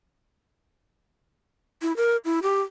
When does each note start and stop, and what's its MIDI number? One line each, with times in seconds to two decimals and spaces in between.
1.82 1.95 64
1.96 2.17 70
2.25 2.39 64
2.43 2.62 67